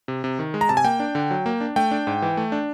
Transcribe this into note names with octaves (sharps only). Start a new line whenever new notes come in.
C3
C3
D#3
G#3
A#5
C3 A5
G#5
A#3 G5
D4
D3
F#3
A#3
D4
A3 G5
D4
G#2
E3
A3
D4